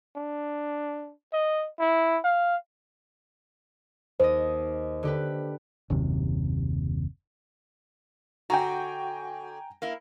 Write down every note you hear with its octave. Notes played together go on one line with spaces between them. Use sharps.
D4
D#5
E4
F5
D#2 C5 D#5
D3 G4 B4
F#1 D#2 C3
D3 F#4 G5 G#5 A#5
A#3 E4